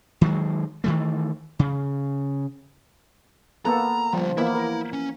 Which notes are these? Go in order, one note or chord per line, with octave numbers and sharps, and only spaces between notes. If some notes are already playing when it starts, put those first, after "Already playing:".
D#3 F#3 G#3
D#3 E3 A3
C#3
A#3 B3 A4 A#5
D3 F3 G3
E3 A#3 B3 E4
A#4
C#4